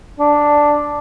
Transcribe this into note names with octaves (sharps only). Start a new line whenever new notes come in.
D4